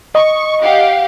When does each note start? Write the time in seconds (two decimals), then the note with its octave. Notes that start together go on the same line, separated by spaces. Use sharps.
0.15 D#5 C#6
0.63 G4 F5 F#5